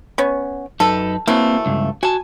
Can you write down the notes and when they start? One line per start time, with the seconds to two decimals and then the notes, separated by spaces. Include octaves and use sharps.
0.18 B3 C#4
0.80 F#2 D#4 A4 B4
1.27 E3 F#3 A3 A#3 C4
1.66 C#2 G2
2.03 F#4 G#5 A5